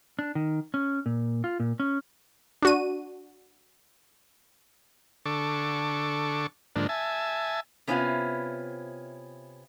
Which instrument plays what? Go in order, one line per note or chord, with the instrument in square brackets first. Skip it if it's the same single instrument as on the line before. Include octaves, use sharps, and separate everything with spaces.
[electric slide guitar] D4
D#3
C#4
A#2
F4
A#2
C#4
[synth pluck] D4 F#4 D#7
[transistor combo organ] D3 A4 C#6 D6
G#2 D3 F3 A#3 D4
E5 G#5 A5
[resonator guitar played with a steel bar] C3 B3 C#4 E4 F4 F5